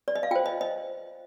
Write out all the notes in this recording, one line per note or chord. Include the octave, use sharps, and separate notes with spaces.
D5
D#5
F5
F4 C5 G5
D#5
D#5